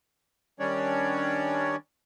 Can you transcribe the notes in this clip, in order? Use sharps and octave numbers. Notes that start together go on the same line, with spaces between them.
D#3 G3 C#4 D4 C#5 D5